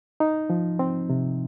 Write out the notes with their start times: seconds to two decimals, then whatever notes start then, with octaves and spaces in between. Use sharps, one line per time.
0.20 D#4
0.50 F3
0.79 C4
1.10 C3